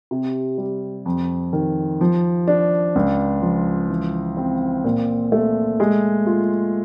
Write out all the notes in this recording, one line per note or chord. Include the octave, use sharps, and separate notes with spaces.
C3
G3
F2
D#3
F3
D4
C#2
F3
E3
C4
A#2
A3
G#3
F4